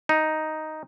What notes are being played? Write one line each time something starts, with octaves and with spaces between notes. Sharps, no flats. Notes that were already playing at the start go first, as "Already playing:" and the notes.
D#4